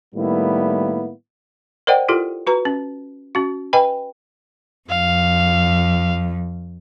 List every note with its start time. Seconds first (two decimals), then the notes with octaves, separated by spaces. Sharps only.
0.15 A2 D#3 G3 A#3 B3 E4
1.87 A#4 C5 D5 D#5 F#5 G5
2.08 E4 F4 G4 A4 A#4
2.47 F#4 B4 A#5
2.65 C#4
3.35 C#4 F#4
3.73 B4 D#5 G5 G#5 B5
4.90 F2 F5